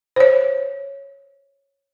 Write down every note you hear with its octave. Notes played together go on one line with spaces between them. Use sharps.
C5 C#5